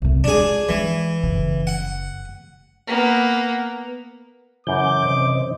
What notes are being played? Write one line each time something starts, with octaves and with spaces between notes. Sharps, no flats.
C2 A3
G#3 D4 F4 G#4
E3 G#3 D#4
F#1 C#3
F#5
A#3 B3
F#2 C#3 E3 D6 G6
C3 C5 D#5